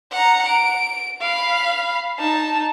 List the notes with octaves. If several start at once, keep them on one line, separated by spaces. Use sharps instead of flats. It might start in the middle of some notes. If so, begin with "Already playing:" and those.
F#5 A#5
D7
F5 B5
D#4 A5